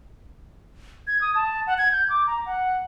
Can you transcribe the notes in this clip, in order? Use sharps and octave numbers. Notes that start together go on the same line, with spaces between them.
G#6
D#6
A5
F#5
G#6
G6
D6
A#5
F#5